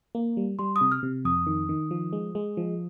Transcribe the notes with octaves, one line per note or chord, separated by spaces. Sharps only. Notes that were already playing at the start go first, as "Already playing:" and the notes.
A#3
G3
G3 C6
D#6
C3
F6
C3
F2 D#6
D#3
D#3
F3
G#3
G#3
F3